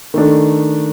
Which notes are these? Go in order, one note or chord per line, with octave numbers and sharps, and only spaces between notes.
D#3 A3 D4